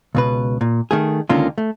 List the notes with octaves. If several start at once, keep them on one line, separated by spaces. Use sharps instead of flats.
C#2 B2 B4
A#2
D#3 A3 G#4
C#2 D3 D#3 A#3 C#4 F4
A3